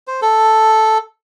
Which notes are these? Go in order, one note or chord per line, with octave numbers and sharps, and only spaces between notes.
C5
A4